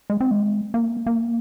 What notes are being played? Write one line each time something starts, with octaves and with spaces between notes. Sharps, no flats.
G#3
C4
G#3
A#3
A#3